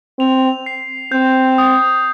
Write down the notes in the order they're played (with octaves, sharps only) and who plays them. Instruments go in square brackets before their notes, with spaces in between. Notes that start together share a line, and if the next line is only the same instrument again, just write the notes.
[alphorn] C4 [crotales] F7
[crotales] C7
[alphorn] C4 [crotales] G6
[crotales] D#6